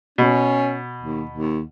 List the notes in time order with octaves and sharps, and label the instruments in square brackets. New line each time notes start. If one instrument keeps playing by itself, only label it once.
[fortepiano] B2 [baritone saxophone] C#4
[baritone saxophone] D#2
D#2